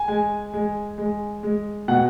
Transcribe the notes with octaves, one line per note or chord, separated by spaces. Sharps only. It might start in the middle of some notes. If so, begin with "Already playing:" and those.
Already playing: G#5
G#3
G#3
G#3
G#3
B2 F#5